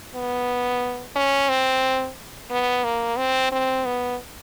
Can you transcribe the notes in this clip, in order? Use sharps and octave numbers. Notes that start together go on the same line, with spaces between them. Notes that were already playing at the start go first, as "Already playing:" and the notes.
B3
C#4
C4
B3
A#3
C4
C4
B3